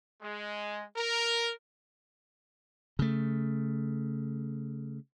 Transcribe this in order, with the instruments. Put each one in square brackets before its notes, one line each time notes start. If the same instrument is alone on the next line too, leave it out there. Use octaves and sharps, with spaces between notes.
[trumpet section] G#3
A#4
[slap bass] C#3 A3